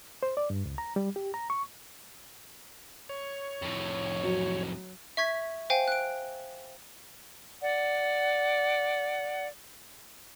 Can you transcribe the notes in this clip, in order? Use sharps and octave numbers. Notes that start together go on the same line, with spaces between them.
C5
D5
G2
C#2
A#5
G3
G4
A#5
C#6
C#5
F2 A2
F#3
E5 C#6 G#6 B6
C5 F5 G5 G#5
F#6 D7
D5 F#5